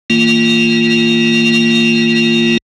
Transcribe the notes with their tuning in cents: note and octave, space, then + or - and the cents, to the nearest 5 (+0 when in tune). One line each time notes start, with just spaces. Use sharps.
E3 -35 A#3 -15 F4 +0